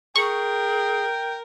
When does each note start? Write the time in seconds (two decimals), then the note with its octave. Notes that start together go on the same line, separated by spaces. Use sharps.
0.16 G#4 A#4 G5 C#6